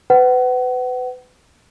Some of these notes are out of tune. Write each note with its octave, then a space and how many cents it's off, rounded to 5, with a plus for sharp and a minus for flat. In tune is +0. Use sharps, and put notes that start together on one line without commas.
B4 +35 F#5 +30